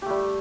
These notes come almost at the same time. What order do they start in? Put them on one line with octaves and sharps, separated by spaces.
G4 A3 G3